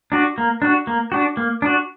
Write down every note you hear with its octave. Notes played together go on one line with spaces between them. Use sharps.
D4 F#4
A#3
D4 F#4
A#3
D4 F#4
A#3
D4 F#4